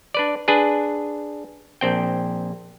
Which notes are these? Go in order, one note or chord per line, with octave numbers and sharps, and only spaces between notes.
D4 B4 D5
D4 G#4 B4
A#1 C4 G5